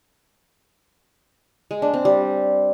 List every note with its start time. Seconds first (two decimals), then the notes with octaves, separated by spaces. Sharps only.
1.71 G#3
1.82 D4
1.94 C4
2.05 G3